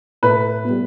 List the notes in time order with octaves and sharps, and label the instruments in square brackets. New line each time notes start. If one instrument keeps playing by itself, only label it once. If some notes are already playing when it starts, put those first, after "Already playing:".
[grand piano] A2 [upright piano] B4
[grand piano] G3 B3